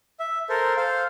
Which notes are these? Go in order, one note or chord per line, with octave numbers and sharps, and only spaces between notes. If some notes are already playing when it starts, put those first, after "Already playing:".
E5
A4 A#4 C5
A4 C5 F5